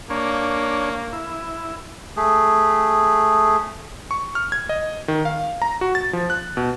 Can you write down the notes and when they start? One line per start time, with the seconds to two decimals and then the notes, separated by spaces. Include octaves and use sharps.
0.10 A#3 D4 C#5
1.13 E4
2.17 A3 G#4
4.11 C#6
4.35 F6
4.52 G#6
4.69 D#5
5.08 D#3
5.25 F5
5.62 A#5
5.81 F#4
5.95 A6
6.13 F3
6.30 F#6
6.57 B2